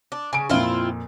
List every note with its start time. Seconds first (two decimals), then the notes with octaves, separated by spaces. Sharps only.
0.12 D4
0.33 C#3 G#5 D7
0.49 F2 A#2 C4 E4 F4